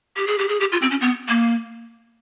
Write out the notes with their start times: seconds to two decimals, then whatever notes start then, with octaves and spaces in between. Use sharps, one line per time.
0.17 G4
0.27 G#4
0.38 G4
0.48 G#4
0.60 G4
0.72 F4
0.82 C4
0.91 C#4
1.01 B3
1.29 A#3